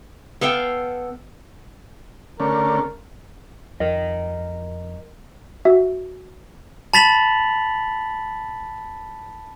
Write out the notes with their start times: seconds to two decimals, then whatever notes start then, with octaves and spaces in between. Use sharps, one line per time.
0.41 B3 A4 F5 G5
2.40 D3 A3 C#4 A#4
3.80 F2 A#4 D#5
5.65 F#4 E5
6.94 A5 B5 A6 B6 F7 F#7